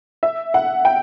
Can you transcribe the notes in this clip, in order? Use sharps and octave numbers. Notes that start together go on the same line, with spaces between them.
E5
F#5
G5